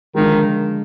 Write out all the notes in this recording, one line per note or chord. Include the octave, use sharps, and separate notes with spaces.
D3 D#3 F3 G#3